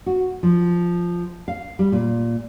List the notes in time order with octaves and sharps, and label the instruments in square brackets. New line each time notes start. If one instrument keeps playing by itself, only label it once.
[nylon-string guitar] F#4
F3
F5
G3
A#2